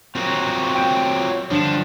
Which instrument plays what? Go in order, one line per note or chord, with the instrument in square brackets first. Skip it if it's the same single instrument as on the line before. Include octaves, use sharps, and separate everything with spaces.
[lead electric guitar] F#3 C4 [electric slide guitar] F4 F#4 A#4
[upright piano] G5 G6 D7
[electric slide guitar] G2 D4 [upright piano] D3 E7 [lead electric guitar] F3